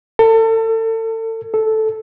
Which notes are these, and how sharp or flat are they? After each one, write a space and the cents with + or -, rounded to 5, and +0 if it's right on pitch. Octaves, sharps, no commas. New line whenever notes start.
A4 +35
A4 -5